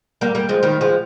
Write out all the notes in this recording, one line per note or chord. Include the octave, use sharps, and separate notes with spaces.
G3 A#3
G3 A#3
F3 G#3
D#3 G3
F3 G#3